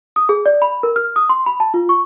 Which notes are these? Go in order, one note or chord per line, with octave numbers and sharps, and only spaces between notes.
D#6
G#4
D5
B5
A#4
F6
D#6
C6
B5
A5
F4
C#6